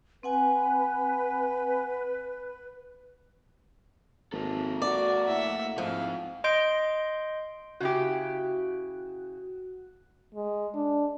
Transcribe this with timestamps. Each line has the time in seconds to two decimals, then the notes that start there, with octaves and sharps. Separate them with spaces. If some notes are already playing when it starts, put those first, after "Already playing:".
0.23 C4 B4 F#5 G#5
4.33 G#1 A#3 A4
4.82 F#4 D5
5.28 A2 E5 F#5
5.78 G#2 F3 C4 F5
6.44 D#5 C6 G6 D7
7.81 C#3 E4 F#4 G4
10.34 G#3
10.74 D4